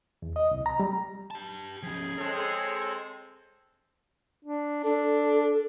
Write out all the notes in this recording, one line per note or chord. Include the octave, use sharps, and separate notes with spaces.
E2
D#5
C2
A#5
G3
G4 A5
F3 C#4 G#4
G#3 C4 A4 C#5
D4
D4 A4